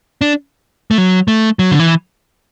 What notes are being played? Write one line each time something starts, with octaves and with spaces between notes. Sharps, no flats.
D4
A3
F#3
A3
F#3
D3
E3